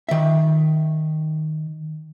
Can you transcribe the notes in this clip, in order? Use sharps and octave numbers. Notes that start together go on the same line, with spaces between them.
D#3 E5